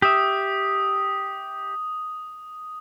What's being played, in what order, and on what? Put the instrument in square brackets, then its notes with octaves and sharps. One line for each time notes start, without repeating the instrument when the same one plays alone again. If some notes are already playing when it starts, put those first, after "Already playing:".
[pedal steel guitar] G4 E5 [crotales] D#6